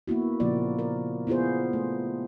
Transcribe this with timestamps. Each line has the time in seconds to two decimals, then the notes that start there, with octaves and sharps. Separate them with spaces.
0.08 A#3 B3 E4 F#4
0.40 A#2 C#3 F3 A#3 F4 D5
0.79 A#4 D5
1.27 B3 E4 F4 G#4 C5
1.73 A3